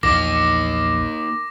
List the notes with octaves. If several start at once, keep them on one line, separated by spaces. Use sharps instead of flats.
A#1 E2 A#3 D#4 D6 A#6